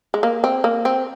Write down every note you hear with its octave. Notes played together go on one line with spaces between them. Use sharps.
G#3
A#3
C4
A#3
C4